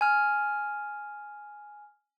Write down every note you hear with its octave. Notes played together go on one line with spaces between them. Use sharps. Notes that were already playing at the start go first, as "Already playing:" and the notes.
G#5 F6